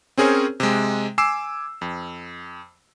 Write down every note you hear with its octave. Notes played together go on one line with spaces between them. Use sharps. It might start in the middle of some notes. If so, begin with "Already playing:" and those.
C4 C#4 G#4 A#4 C5 C#5
C3 G#3
G#5 D6 E6 C7 E7
F2